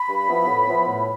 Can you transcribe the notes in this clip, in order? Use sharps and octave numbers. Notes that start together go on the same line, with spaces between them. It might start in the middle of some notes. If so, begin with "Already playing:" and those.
Already playing: B5
G2
F3 B3 E4
A2
F3 B3 E4
A2